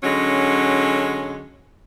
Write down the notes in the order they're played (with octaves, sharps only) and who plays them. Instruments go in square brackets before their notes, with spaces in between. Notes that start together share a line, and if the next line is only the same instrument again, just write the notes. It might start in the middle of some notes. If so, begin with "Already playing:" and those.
[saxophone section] D3 F#3 G#3 C#4